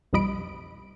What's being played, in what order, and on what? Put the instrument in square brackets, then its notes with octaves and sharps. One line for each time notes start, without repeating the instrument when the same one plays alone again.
[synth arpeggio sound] B1 F2 G3 D#5 B5 D7